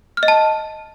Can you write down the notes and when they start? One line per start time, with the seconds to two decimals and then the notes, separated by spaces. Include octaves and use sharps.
0.17 F6
0.23 D#5
0.28 A5